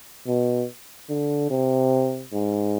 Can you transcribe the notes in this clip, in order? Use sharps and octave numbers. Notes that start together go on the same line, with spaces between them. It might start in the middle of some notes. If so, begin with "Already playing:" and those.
B2
D3
C3
G#2